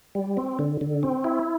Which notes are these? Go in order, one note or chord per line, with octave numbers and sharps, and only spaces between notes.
G3
C4
D3
D3
C4
E4